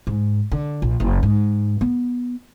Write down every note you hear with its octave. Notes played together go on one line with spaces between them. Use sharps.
G#2
D3
A#1
F#1
G#2
B3